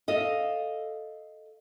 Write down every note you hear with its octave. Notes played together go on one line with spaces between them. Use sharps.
A4 D#5 F5